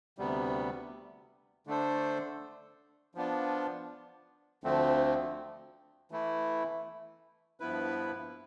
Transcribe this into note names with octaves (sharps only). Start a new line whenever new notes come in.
D2 C3 G3 B3
D3 A3 D4 A4 C5
F3 B3 D4 F4
D2 D3 F3 A3 C4
E3 A3 E4
G2 F3 B3 E4 B4